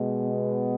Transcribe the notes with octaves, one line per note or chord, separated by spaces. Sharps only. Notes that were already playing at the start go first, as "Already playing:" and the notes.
Already playing: B2 G#3
B3